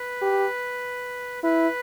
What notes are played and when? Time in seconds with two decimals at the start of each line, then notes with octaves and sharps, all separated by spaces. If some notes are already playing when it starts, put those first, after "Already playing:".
Already playing: B4
0.22 G4
1.43 E4 B4